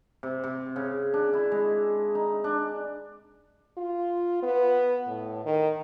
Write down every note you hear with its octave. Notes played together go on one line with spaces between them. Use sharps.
C3
C3
C#3
D4
E4
G#3
D#4
D4
F4
B3
A2
D#3